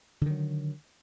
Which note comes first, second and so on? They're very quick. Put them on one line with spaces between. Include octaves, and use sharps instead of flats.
D3 D#3 F#3